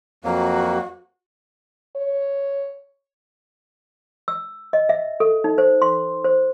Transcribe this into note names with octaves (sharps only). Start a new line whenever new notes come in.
F2 F#3 A#3 F#4
C#5
E6
D#5
E5
A4
D#4
C5
C6
C5